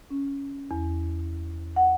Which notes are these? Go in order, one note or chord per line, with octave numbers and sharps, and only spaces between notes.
C#4
E2
F#5